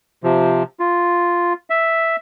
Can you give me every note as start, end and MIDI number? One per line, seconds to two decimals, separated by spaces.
0.24 0.63 48
0.24 0.63 53
0.80 1.53 65
1.70 2.16 76